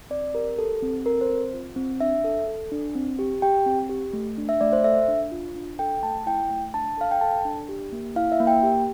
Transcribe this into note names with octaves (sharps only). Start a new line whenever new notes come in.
C4 D5
G4 A#4
G4 A4
C4
A4 A#4
C5
C4
F4
C4
D4 E5
A4
A4
D4
C4
G4
G4 G5
C4
G4
A3
D4
E5
A3 D5
C5
A4 E5
D4
F4
D4
A4 G5
A3 A5
E4 G5
A3
D4 A5
A4 F5
G5
A4 A5
D4
G4
A#3
E4 F5
E5
A#3
G5
G4